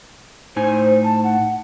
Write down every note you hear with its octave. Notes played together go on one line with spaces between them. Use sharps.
A2 D#4 C5 G#5
A5
F#5